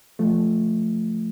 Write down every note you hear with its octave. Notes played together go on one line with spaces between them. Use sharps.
F3 A3